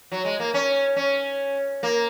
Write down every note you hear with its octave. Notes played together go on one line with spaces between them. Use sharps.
F#3
G#3
A#3
C#4
C#4
A#3